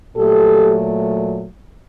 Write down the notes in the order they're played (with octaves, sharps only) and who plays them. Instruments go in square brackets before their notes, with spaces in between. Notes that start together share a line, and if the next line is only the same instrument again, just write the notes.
[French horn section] A#2 F#3 A3 G4 A4